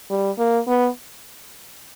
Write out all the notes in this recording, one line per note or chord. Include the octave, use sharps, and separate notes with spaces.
G3
A#3
B3